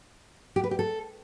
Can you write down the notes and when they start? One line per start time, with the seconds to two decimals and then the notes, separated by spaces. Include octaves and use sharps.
0.56 G4
0.64 B4
0.71 G4
0.79 A4